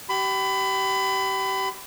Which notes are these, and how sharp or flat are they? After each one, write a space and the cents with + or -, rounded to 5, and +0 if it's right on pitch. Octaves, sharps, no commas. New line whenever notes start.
G4 -30 B5 +25